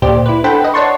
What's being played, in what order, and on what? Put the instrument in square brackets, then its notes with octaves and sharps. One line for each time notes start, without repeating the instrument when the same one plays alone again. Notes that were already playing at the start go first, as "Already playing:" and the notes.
[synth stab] D2 A#2 G4 C5 D5
E4 B4
D4 A4 C5 F#5 G5 B5
B4 D#5
C#5 D5 F#5 A5 C6 C#6